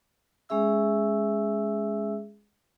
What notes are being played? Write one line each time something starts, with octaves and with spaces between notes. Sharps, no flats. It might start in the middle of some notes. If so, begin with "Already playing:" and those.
G#3 C#4 G#4 E5 E6